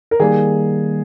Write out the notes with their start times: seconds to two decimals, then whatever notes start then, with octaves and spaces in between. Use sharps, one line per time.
0.11 A#4
0.20 D#3 G3 A#3 G#4